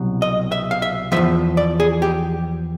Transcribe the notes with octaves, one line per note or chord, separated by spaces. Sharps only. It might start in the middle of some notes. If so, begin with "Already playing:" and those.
Already playing: C2 B2 F#3
D#5
E5
F5
E5
E2 C#3 F3 E5
D5
G#4
G4